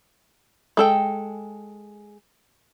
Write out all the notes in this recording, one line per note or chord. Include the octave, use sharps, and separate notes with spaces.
G#3 A4 G5